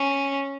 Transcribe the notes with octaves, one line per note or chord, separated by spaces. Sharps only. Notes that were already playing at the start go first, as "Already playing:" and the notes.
Already playing: C#4